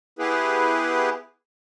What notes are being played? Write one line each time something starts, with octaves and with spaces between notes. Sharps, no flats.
B3 E4 G4 G#4 B4